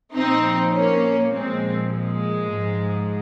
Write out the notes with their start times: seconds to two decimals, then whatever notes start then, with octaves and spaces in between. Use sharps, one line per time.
0.14 A#2 F3 C4 D#4
0.73 A#3 C#4
1.32 A#2 F3 G#3 C4
1.92 G#3
2.51 G#2 F3